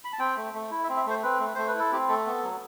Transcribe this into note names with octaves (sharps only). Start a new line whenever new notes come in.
B5
A5
C4 G5
A3
A3
E4
E5
C4
E5
A3 C5
C4 B4
A3
A3 C5
B4
E4 A4
C4 G4
A3 A4
B3
F#3